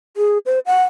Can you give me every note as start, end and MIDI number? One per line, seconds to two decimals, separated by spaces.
0.17 0.38 68
0.46 0.59 72
0.66 0.83 78